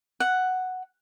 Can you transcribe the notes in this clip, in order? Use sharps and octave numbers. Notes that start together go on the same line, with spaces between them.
F#5